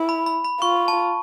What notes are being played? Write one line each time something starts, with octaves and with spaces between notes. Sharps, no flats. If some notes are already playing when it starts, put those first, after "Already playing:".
Already playing: E4
B5
B5
B5
F4 C#6
A5